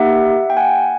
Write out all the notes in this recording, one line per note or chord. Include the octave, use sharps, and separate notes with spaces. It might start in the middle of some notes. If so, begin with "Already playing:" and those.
Already playing: A#3 D#4 G4 E5 F#5
G5
F#5 G#5